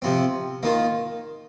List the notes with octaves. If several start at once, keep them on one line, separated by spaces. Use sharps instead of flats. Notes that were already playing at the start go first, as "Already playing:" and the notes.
C3 F3 C4
D#3 A#3 F4